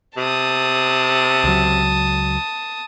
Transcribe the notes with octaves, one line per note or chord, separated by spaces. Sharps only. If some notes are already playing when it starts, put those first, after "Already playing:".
C3 A5 D#6
C#2 F#3